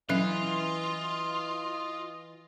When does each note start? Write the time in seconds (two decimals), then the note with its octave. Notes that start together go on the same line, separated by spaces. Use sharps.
0.09 E3 F#3 C#4 F4 D#5